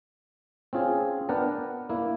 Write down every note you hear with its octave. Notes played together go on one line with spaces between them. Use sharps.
C4 C#4 F4 G#4
B3 D4 A#4 F#5 G5 A5
A#3 E4